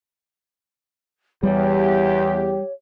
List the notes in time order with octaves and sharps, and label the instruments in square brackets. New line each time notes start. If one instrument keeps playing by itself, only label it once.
[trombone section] E2 [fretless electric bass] G3 [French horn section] G4 [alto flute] C#5